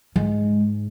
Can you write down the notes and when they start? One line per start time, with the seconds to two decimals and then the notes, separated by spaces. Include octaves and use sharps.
0.16 G#2 G#3